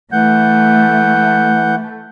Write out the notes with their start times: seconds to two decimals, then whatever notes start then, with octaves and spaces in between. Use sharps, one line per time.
0.12 E3 A3 F#5 G6